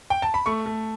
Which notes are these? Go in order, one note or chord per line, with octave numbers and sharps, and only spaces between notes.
G5
A5
B5
A3 C#6
A3